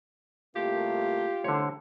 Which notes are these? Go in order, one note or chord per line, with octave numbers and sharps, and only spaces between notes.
C2 A3 A#3 F4 G4
C2 D3 A3 C5 C#5